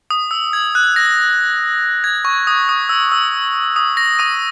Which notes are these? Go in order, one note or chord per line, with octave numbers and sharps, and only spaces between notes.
D#6
E6
G#6
F#6
A#6
G#6
C#6
D#6
D#6
E6
E6
D#6
A#6
D#6 D#7